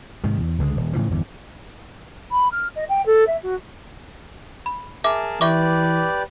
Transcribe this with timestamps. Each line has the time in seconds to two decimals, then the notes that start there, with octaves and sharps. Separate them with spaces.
0.24 G#2 C3 D#3
0.40 E2
0.58 C#2 D3 E3 G#3
0.76 D#1
0.93 A2 C#3 E3 F3
1.10 G1 E2
2.31 B5
2.51 F6
2.75 D#5
2.89 G5
3.06 A4
3.27 E5
3.42 F#4
4.66 B5
5.04 G#4 A#4 E5 A5 D6
5.41 E3 G4 B4 D5 E5 C#6 D6